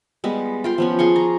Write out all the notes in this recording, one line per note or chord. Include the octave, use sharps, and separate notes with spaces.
G3 G#3 B3
F4 G5 C6
F3 B3 C#4
F4 G#4 C6 C#6
A#5